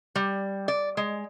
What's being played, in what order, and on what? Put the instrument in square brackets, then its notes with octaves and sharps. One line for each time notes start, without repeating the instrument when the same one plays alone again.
[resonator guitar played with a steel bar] G3
D5
G#3